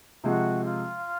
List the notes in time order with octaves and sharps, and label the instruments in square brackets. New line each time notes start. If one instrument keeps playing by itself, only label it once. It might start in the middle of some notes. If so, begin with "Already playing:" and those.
[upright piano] C3 F3 G#3 [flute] F#4
[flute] F4